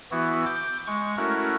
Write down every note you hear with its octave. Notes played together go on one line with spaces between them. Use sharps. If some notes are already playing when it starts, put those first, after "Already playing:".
E3 B3 E4 F#4
D6 G6
G#3 C#6
A3 C#4 E4 F#4 A#4